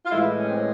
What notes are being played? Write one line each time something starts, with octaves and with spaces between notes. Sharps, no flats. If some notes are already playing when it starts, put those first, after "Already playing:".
F4
A2 E3 G#3 E4
C#4
C4
C#4